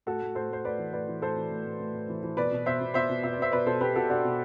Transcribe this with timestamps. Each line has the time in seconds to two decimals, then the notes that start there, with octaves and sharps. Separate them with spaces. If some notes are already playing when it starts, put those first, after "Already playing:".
0.06 A2 F#4 A4
0.22 A2
0.35 A2 A4 C5
0.50 A2 C5
0.64 A2 B4 D5
0.78 E3
0.93 A2 B4 D5
1.08 E3
1.22 A2 A4 C5
1.36 E3
1.50 A2
1.66 A2
1.79 A2
1.93 A2
2.09 E3
2.23 E3
2.37 B2 B4 D5
2.51 B2
2.66 B2 C5 E5
2.80 B2
2.94 B2 C5 E5
3.09 B2
3.23 B2 E5
3.33 D5
3.38 B2 C5 E5
3.52 B2 B4 D5
3.66 B2 A4 C5
3.81 B2 G4 B4
3.96 B2 F#4 A4
4.10 B2 D4 F#4
4.24 B2